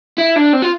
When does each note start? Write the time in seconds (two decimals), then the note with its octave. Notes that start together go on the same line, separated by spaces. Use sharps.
0.18 E4
0.36 D4
0.53 C4
0.62 F4